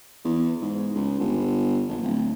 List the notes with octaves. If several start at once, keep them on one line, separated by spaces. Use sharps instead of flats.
E2
G#2
C#2
G1
A#1
D1